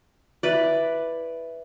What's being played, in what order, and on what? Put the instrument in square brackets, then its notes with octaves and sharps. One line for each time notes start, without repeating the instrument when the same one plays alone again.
[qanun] E4 B4 D5